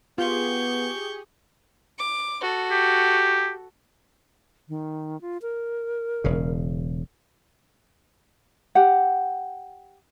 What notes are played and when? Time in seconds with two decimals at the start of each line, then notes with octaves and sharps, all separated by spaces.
0.18 B3 F4 G4 G#4 C#6 G6
1.98 D6
2.41 F#4 A4
2.71 G4
4.69 D#3
5.21 F4
5.42 A#4
6.24 E1 C#3
8.75 G4 F#5